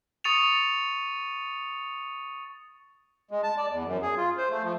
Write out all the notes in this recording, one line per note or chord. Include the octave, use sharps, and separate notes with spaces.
C#6 D#6 A6 C#7 D#7 F7
G#3
A5
D5
E2
F#2
G#4
F4
C5
A3
F3